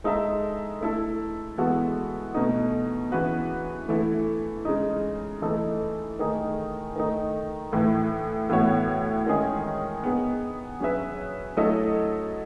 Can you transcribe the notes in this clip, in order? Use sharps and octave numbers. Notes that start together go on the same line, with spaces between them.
G#3 D#4 A4 E5
A3 E4 A4
E3 G#3 B3 F#4 A4
B2 A3 D#4
C#3 E3 B3 F#4 B4
E3 A3 E4
C#3 G#3 D#4
E3 A3 D#4 A4
D#3 A3 D#4 G#4
D#3 A3 D#4
A2 E3 A3
A2 E3 B3 F#4 C#5
D#3 G#3 C#4 G#4 D#5
B3 D#4 G#4
F#3 C#4 G#4 B4 E5
F#3 A3 E4 A4 D#5